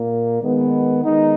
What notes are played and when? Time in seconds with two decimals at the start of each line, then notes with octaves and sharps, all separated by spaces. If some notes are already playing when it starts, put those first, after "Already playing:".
Already playing: A#2 A#3
0.41 D#3 G#3 B3
1.03 D#3 G#3 B3 D#4